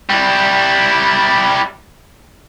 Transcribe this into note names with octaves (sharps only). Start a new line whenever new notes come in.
G3 E4